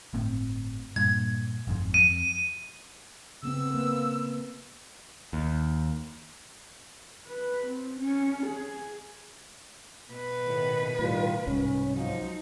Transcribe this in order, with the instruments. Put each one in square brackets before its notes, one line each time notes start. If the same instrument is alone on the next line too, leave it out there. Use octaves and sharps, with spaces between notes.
[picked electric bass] G1 A2 C4
[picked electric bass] G2 A#2 [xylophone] G#6
[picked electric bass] G1 F2 G#2
[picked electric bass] F2 [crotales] D#7
[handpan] C#3 B3 C4 [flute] E6
[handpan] A#3 B4
[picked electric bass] D#2
[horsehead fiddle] B4
C4
C#4
G#4
[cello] B2 B4
[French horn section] A2 D#3
[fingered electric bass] A2 [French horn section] D#3 G3 F4
[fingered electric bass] C2 G#2 [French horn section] C#4
[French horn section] F3 F#3 [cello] D#4